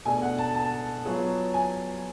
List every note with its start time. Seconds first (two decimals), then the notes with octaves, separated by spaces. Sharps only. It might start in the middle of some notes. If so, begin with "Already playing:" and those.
0.05 B2 A3 D4 G#4 G#5
0.22 F#5
0.38 A5
0.55 A5
1.05 F#3 B3 F4 G#4 C#5
1.54 G#5